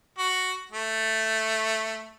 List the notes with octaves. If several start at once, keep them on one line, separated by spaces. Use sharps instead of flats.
F#4
A3